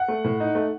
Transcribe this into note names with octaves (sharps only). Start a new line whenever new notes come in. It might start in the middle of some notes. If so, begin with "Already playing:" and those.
Already playing: F#5
A3
A2
D#4
A3